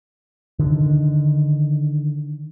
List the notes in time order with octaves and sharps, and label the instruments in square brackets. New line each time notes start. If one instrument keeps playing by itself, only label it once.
[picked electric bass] D3 D#3